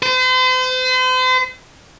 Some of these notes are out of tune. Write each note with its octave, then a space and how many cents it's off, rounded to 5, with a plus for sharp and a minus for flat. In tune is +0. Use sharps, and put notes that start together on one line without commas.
C5 -40